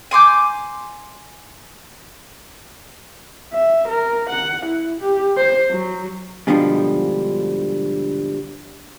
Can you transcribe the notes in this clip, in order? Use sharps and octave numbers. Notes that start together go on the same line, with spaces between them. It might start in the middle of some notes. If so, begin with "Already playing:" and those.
G#5 C6 D6 G6
E5
A#4
F#5
E4
G4
C5
F#3
G#2 B2 D3 F3 G3